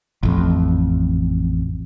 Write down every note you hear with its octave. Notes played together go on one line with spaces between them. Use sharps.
A1 F2